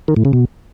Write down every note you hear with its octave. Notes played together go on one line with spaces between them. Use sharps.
D#3
A2
C#3
B2